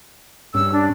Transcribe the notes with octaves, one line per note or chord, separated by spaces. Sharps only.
G2 C#4 E6
D4